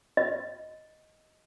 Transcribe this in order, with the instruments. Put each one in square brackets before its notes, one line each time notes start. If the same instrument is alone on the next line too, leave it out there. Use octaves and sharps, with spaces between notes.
[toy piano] D#5